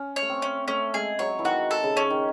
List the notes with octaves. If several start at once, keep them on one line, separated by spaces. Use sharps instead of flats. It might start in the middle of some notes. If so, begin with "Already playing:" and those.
Already playing: C#4
C#5
A3
C4
C#4
A3 C#4
G#3 G#4
F#3 C#5
E3
D#3 F#4
A4
C#3
C#4
D#3